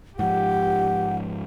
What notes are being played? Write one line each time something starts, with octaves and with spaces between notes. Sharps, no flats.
G#2 F3 G4 F#5